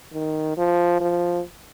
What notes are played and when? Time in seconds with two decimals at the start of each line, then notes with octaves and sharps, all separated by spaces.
0.13 D#3
0.57 F3
1.01 F3